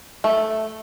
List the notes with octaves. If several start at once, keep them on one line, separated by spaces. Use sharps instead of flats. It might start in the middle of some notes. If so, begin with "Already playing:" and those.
A3